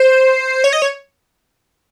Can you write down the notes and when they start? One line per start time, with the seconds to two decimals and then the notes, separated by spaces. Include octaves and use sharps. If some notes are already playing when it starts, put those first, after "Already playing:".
Already playing: C5
0.64 C#5
0.73 D#5
0.82 C#5